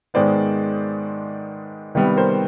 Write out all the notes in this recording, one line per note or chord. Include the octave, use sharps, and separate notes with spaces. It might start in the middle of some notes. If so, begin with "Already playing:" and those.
G#2 D#3 G#3 B3 C5 D5
C3 D#3 G3 B3
A#4 C5